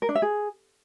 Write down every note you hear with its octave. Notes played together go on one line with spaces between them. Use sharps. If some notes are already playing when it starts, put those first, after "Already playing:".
A#4
D4
E5
G#4